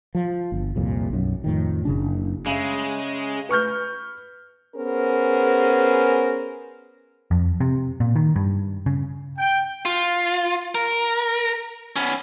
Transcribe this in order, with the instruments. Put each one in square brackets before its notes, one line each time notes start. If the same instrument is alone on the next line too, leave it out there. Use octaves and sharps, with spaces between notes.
[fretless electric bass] F3
G1
C2 F2 A#2
B1 F#2
F2 A2 D#3
F#1 C#3 D4
[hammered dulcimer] C#3 E5 [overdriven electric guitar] G#3
[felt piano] B4 C#6 F6 G6
[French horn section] B3 C#4 G#4 A#4 C5
[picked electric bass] F2
C3
A#2
D#3
G2
C#3
[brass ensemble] G5
[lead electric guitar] F4
A#4
B3 C#4